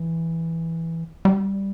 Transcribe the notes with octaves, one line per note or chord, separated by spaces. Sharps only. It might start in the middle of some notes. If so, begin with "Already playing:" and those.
Already playing: E3
G3